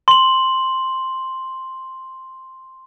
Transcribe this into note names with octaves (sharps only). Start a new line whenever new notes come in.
C6 F#7